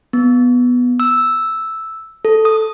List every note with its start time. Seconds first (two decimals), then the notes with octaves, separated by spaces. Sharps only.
0.13 B3
1.00 E6
2.25 A4
2.45 D#6